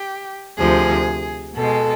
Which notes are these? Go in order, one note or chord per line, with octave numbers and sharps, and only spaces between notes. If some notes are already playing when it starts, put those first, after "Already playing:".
Already playing: G4
D2 C3 F3 G#4
B2 G#3 A4